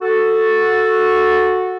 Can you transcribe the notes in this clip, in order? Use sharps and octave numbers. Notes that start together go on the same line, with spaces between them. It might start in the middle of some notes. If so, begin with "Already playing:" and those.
F#4 A4